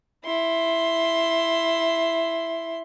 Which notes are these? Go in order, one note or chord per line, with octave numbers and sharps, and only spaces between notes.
E4 C6